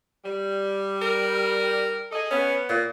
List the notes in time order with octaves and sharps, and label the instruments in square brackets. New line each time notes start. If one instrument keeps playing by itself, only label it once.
[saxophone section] G3
[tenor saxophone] A#4
[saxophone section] G#4 A4 D#5
[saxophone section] B3 [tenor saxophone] C#4
[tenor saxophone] A#2